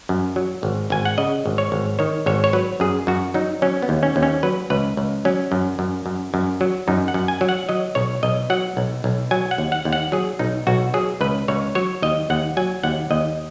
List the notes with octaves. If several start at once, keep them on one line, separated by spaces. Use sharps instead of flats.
F#2
F#3
G#1
G#1 G#5
F#5
C#3 D#5
G#1
C#5
G#1
D#3 C#5
G#1 C#5
C#5
F#3 B4
F#2 G#4
F#2 F#4
F#3 D#4
F#3 C#4
B3
D#2
C#4
D#2
C#4
F#3 B4
C#2 B4
C#2
F#3 C#4
F#2
F#2
F#2
F#2
F#3
F#2 D#4
F#5
F#2
G#5
F#3
F#5
F#3 D#5
B1 C#5
B1 D#5
F#3 F#5
B1
B1
F#3 G#5
F#5
D#2
F#5
D#2
F#5
F#3 G#4
B1 D#4
B1 F#4
F#3 G#4
C#2 B4
C#2 C#5
F#3 C#5
D#2 D#5
D#2 F#5
F#3 G#5
D#2 F#5
D#2 D#5